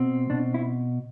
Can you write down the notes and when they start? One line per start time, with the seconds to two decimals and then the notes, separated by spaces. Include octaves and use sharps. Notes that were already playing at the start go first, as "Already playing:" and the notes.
Already playing: B2 C4
0.30 B2 D4
0.54 E4